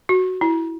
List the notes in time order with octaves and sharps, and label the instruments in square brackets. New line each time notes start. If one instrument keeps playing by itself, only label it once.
[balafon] F#4
E4